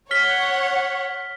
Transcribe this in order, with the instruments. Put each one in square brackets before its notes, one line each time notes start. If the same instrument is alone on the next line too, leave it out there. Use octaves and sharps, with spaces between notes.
[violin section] C#5 F#5 [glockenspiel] F6 B6 G7